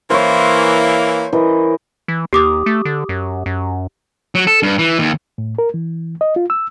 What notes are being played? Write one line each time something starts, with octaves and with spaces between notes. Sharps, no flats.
E3 A#3 C5 C#5
E3 A#4 D#5
E3
D#2 G4 D6 D#6
A3
D3
F#2
F#2
F#3
A4
G2
E3
D#2
A2
A#4
E3
D#5
F4
E6